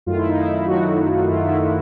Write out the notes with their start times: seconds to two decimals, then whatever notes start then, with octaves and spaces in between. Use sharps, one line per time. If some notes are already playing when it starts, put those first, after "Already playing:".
0.06 F#2 D#3 F#3 A3 F4
0.17 E4
0.28 D#4
0.39 E4
0.67 F#2 D#3 F#3 A3 F#4
1.29 F#2 D#3 F#3 A3 F4
1.44 E4
1.59 E4